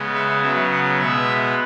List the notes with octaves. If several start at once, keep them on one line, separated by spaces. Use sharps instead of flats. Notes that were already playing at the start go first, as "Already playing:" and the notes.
Already playing: C#3 G#3 B3
E5
C#3 F#3 B3 E5
F#5
B2 G#3 B3 E5